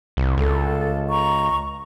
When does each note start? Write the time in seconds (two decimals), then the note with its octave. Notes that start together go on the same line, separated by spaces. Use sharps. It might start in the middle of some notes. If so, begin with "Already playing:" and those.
0.17 C2
0.37 C#2 A4
1.09 A#5 C#6